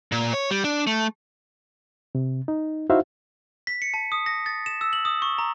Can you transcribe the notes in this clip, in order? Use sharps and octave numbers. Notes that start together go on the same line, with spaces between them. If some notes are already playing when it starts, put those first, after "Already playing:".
A#2
C#5
G3
D4
A3
C3
D#4
D#4 E4 F#4 C5 E5 F5
B6
C#7
A5
D#6
A#6
A6
E7
E6
F#7
D#6
C#6
A#5